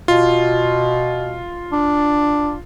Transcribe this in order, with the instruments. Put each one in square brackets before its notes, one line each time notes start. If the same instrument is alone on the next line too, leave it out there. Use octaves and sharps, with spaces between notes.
[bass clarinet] B2 [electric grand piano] F4
[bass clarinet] D4